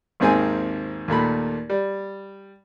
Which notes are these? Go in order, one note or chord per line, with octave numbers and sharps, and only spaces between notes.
G#1 D#2 D#3 C4 G#4 G#5
D#2 A#2 A3 B5
G3